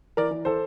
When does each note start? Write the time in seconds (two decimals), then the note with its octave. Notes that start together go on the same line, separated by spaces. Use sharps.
0.17 E3 A#4 D5
0.31 E3
0.45 E3 A4 C5